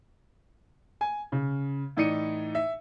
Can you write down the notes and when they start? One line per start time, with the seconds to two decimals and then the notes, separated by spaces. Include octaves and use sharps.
1.01 G#5
1.32 C#3
1.97 A2 E3 D#4 D5 C#7 D#7
2.55 E5